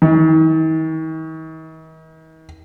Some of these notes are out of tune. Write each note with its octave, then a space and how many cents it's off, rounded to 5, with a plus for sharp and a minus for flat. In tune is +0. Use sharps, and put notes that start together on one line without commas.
D#3 +45